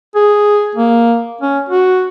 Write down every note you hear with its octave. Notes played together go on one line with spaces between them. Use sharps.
G#4
A#3
C#4
F#4